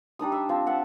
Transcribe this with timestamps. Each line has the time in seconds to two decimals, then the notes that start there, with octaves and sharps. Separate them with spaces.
0.19 G3 D4 D#4 D#6
0.32 E5
0.49 F3 C4
0.66 E5 F#5 A5